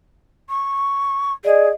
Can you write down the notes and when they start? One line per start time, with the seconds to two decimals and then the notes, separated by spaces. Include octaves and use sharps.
0.50 C#6
1.45 G#4 D5 D#5